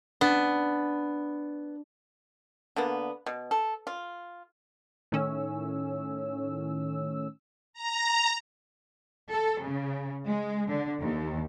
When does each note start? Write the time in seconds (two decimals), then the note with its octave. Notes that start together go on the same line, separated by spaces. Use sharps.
0.21 B3 D4
2.76 D3 A#3 B3
3.26 B2
3.51 A4
3.87 F4
5.12 A2 D#3 C#4 E6
7.73 A#5
9.30 A4
9.62 C#3
10.27 G#3
10.70 D3
11.02 D#2